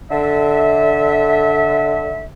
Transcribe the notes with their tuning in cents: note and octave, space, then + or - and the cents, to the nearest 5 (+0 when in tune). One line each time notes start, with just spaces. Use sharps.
D3 +0 E5 -25